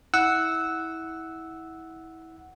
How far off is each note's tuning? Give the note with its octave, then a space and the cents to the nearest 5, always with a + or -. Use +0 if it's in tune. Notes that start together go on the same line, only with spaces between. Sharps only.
E4 -25 F#5 +0 E6 -10